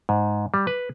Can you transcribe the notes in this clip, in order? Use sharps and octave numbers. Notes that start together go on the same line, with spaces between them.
G#2
G3
B4